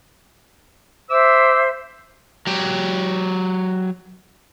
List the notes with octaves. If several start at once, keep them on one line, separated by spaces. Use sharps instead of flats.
C5 E5 D6 E6
F#3 G4